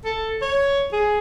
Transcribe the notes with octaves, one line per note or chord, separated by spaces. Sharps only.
A4
C#5
G#4